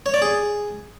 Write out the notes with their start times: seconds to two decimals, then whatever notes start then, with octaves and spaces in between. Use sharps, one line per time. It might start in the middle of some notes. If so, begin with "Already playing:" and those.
0.06 C#5
0.14 D5
0.22 G#4